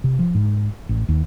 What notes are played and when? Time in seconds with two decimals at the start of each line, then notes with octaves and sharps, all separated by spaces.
0.04 C3
0.19 F3
0.35 G#2
0.89 A1
1.09 D#2